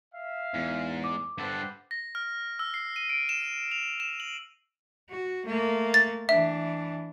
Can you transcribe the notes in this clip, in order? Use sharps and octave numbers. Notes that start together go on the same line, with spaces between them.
E5 F5
E2 G#2
D6
G2 A4 B4 C5 F#5
A#6
F6
E6
C7
D#7
D7
E7
F7
E7
F#7
F#4
A3 A#3
A6
E3 D4 E5